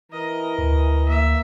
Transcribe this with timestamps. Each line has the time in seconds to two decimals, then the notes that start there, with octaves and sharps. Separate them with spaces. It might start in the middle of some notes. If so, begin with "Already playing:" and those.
0.12 E3 A#4 D#5
0.59 D2
1.06 A#3 E5